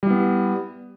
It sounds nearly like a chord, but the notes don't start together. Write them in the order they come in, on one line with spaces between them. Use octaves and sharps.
G3 E4 B3